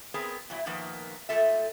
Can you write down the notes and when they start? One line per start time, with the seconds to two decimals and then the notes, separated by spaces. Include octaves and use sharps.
0.14 B3 C4 G#4 A#4 C5
0.50 A#2 F#3 E4
0.66 A#2 D#3 F3 A#3 B3
1.29 G#2 A3 F4 A4 E5